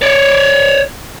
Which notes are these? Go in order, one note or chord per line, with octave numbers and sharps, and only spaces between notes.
C#5 D5